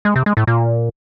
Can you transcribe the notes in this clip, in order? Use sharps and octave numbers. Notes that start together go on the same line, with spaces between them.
G#3
C3
G#3
A2
A#2